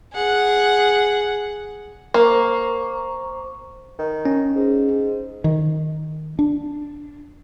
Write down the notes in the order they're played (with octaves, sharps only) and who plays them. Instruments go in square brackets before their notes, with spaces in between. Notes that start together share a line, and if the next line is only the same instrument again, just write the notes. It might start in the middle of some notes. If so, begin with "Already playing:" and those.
[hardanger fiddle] G#4 F#5
[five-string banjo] A#3 [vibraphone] C5 A#5 C#6
[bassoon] D#3
[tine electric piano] C#4
[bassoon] G#2
[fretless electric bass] D#3
D4